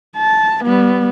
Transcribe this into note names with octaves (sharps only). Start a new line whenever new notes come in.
A5
G3 B3